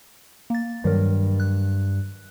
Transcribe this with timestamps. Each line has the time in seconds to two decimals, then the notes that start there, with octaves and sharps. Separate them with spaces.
0.50 A#3 A6
0.84 G2 D#3 F#3 A#4
1.40 F#6